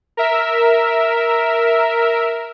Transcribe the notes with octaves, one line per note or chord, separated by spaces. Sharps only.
A#4 E5